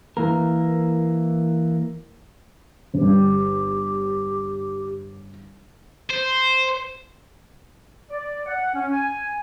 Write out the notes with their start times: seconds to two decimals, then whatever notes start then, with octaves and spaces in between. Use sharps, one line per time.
0.17 E3 A#3 A#4
2.94 G1 G4
6.10 C5
8.10 D5
8.46 F#5
8.74 C#4
8.92 G#5